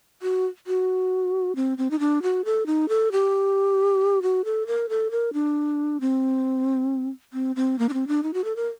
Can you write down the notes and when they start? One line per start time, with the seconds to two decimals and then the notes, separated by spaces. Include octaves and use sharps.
0.22 F#4
0.67 F#4
1.56 C4
1.78 C4
1.91 D#4
1.99 D4
2.22 F#4
2.45 A4
2.66 D#4
2.89 A4
3.12 G4
4.22 F#4
4.45 A4
4.67 A#4
4.89 A4
5.11 A#4
5.33 D4
6.01 C4
7.33 C4
7.56 C4
7.79 A#3
7.89 D4
7.93 C4
8.08 D4
8.23 D#4
8.34 F#4
8.44 A4
8.56 A#4